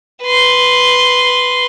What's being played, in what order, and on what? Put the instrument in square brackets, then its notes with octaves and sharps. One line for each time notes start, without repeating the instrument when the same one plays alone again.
[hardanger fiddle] B4 C6